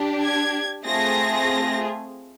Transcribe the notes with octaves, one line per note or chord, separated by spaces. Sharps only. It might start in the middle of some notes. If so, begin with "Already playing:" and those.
Already playing: D4 G4
G#6
A3 C4 F4 G#4 A#6